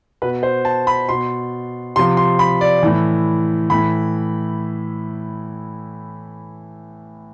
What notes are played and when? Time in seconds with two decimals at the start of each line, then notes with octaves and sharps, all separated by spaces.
0.22 B2 B4
0.43 C5
0.65 A5
0.87 B5
1.09 B2 C6
1.96 C3 F3 C6
2.17 C6
2.39 B5
2.61 D5
2.83 A2 E3
3.70 A2 E3 B5